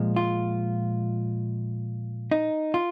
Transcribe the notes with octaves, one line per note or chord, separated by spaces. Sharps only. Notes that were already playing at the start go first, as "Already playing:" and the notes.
Already playing: A#2 F3 G#3
F4
D#4
F4